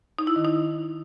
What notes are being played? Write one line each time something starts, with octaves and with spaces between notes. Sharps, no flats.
D#4
E4
D#3
D#4